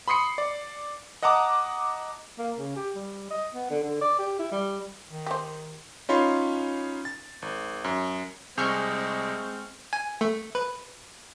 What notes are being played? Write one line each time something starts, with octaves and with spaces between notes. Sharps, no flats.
B5 C6 D#6 C7 C#7
D5
D#5 F#5 A5 A#5 D6 D#6
A#3
C#3
G4
G3
D#5
B3
D3
D3
D5
G4
E4
G3
D#3
G4 C5
C#4 D#4 F4 C#5 B5 C6
A6
G#1
F#2
C2 G#3 C4 G#4 C#6 E6 F6 G6
G#5
A3
B4